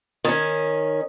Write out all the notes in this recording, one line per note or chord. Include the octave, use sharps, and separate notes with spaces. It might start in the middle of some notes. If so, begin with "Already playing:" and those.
D#3 C#4